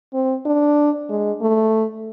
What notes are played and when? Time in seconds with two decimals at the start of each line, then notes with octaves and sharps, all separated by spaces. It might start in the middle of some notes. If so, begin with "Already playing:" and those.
0.13 C4
0.45 D4
1.09 G#3
1.41 A3